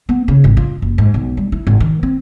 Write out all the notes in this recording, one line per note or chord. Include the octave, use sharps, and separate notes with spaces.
B3
C#3
G#1
F4
F#1
G#2
B1
G3
E4
G#1
D#3
C4